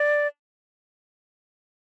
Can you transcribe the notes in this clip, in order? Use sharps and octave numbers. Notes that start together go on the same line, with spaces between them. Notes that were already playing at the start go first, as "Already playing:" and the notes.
Already playing: D5